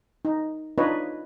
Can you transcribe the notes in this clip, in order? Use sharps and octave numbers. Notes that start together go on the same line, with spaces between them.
D#4
D4 D#4 F4 B4 C#5 D#5